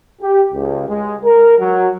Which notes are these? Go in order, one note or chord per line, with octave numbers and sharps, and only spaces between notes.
G4
C#2
G#3
A#4
F#3